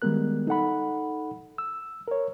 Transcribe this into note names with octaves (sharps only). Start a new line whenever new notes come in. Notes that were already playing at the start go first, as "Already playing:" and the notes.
D#3 G3 G#3 B3 A#4 F#6
D#4 A4 F#5 B5
E6
A#4 C#5